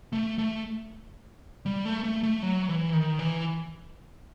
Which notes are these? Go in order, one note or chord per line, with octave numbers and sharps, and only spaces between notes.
A3
A3
G3
A3
A3
A3
F#3
E3
D#3
E3